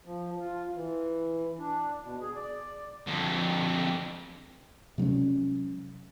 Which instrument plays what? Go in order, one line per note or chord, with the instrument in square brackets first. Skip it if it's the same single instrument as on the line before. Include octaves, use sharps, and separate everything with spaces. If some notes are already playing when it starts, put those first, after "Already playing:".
[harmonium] F3
F4
E3
D4
B2
G#4
D5
[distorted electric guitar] F2 D3
[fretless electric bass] C3 F#3 G#3 C#4